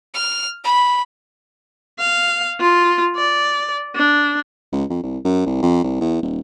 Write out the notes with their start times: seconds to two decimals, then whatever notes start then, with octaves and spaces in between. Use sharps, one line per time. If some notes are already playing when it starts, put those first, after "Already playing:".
0.14 F6
0.64 B5
1.99 F5
2.60 F4
3.16 D5
3.96 D4
4.72 C#2
4.90 F2
5.03 C2
5.25 F#2
5.46 C2
5.62 F2
5.84 C2
6.01 E2
6.22 D#1